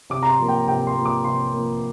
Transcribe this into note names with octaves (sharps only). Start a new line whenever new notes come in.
C3 D6
A#5
C6
F3 A#3
G5
C3 G5
C6
F3 A#3
D6
C3 C6
F3 A#3